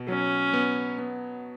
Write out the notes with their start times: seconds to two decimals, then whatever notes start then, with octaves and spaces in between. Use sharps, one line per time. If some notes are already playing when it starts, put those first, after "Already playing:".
Already playing: B2
0.08 F#3 C#4
0.53 B3
0.99 B3